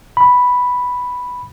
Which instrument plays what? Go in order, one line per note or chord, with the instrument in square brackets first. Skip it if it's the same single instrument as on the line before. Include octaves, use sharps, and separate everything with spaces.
[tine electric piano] B5